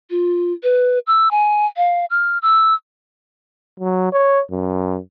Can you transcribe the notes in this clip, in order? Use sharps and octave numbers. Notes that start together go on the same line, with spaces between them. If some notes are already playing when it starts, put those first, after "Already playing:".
F4
B4
E6
G#5
F5
F6
E6
F#3
C#5
F#2